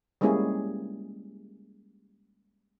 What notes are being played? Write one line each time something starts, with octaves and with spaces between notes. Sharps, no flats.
G3 G#3 A#3 C#4 E4 G#4